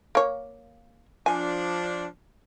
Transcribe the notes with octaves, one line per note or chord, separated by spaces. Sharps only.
A#3 C#5
F3 D4 G#5